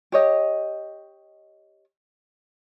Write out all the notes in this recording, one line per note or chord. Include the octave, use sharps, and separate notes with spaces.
G4 C#5 D#5